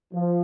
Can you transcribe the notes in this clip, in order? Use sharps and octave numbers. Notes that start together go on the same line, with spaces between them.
F3